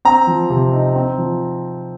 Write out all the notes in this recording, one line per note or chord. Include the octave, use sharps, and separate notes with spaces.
C4 A#5
F3
C3
D#4
C4
F3